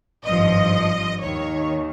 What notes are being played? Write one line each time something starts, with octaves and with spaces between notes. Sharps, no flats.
G#1 G2 F3 D#5
D#2 D#3 C#5